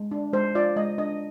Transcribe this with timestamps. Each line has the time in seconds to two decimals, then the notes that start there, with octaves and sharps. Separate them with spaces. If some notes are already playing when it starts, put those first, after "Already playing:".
Already playing: G#3
0.11 D4
0.33 G#3 C5
0.55 F4 D5
0.76 G#3 D#5
0.98 D4 D#5